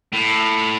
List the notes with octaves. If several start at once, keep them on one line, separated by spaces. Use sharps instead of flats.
A2